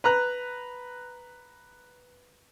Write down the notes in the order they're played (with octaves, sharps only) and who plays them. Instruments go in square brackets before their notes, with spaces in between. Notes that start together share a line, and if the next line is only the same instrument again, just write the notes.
[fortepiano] B4 A#5 F#6